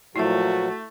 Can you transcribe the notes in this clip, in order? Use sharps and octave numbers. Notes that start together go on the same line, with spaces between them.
A#2 F3 F#3 A3 E4 F#4 E5